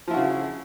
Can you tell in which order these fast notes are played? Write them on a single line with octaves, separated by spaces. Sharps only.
F3 E4 F#4 C#3